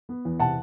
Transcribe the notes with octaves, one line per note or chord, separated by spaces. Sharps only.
B3
E2
C3 F#5 A5